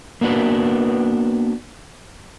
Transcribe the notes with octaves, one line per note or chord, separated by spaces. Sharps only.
A#3 B3 D4 F#4 B4